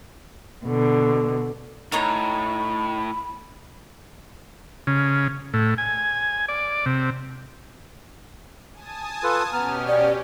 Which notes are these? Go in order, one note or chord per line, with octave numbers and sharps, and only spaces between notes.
B2 D3
A2 D#4 C#5 A#5 B5
C#3
A2
G#5
D5
C3
G#5 A5 D#6
F4 A4 B4
B2 B3 C#4 G4 A#5 F6
D5